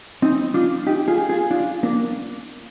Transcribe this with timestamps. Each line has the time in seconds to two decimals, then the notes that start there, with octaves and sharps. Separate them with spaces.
0.22 C4 D#4
0.54 D4 F4
0.87 D#4 G4
1.08 F4 G#4
1.29 F4 G#4
1.51 D4 F4
1.83 A#3 D4